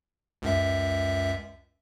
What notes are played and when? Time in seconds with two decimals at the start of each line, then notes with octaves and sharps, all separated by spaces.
0.42 C#2 F#2 E5